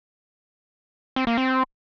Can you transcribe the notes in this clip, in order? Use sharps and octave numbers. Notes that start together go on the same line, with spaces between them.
C4
A#3
C4